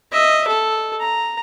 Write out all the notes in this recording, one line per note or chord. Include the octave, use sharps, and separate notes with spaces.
D#5 E5
A4
A#5